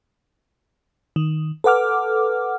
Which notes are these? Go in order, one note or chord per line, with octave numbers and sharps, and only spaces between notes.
D#3
A4 B4 F#5 D6 F6